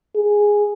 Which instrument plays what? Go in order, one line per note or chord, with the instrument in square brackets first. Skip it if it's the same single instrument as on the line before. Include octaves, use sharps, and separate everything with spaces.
[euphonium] G#4